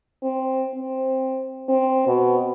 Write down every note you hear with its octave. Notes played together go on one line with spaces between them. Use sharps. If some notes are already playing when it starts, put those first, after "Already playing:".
C4
C4
C4
B2